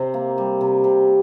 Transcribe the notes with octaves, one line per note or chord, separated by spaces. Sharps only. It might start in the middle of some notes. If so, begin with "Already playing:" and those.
Already playing: C3 C4
A#3
G3
C3
C3